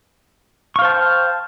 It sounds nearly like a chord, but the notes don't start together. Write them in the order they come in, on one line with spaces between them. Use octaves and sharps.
C#6 F5 C5 A5 G5